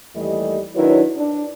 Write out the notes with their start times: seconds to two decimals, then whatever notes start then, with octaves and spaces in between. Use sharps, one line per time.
0.15 D#2 E3 G3 A3 D#5
0.76 D#3 F#3 D4 E4 B4 C#5
1.16 D4